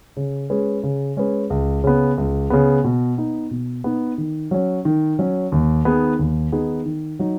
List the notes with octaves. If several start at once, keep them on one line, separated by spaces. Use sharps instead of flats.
C#3
G#3 C#4 G#4 B4
C#3
G#3 C#4 G#4 B4
C#2
C#3 B3
C#2
C#3 B3
B2
B3 D#4
B2
B3 D#4
D#3
F#3 C#4
D#3
F#3 C#4
D#2
D#3 B3 D#4 G#4
D#2
D#3 B3 D#4 G#4
D#3
F#3 D#4